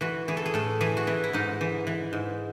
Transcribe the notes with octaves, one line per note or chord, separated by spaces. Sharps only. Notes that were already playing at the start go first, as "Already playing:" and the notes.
E3 F#4
E3 G#4
A4
G#4
A2 A4
E3 G#4
F#4
E3 E4
E4
G#2 D#4
E3
E3
G#2